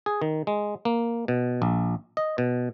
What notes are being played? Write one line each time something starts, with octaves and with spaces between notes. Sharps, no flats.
G#4
D#3
G#3
A#3
B2
A#1
D#5
B2